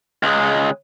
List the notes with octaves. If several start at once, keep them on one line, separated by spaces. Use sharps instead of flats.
C#2 G#3